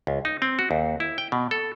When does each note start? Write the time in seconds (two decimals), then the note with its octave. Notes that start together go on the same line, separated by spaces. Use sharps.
0.07 C#2
0.25 D#4
0.42 C4
0.59 F#4
0.71 D#2
1.00 E4
1.18 G5
1.32 B2
1.51 A4